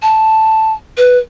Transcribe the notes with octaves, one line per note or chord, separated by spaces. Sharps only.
A5
B4